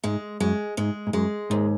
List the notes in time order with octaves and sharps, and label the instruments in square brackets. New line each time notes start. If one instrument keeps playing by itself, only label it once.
[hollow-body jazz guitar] G#2 [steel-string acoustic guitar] G#3
[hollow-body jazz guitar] F#2 [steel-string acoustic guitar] G#3
[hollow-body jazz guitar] G#2 [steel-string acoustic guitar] G#3
[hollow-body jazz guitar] G#2
[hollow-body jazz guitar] F#2 [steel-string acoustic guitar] G#3
[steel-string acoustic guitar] D#2 [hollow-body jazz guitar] G#2